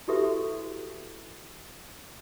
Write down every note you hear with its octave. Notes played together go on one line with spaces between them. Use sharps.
E4 F#4 G4 A4 B4 E5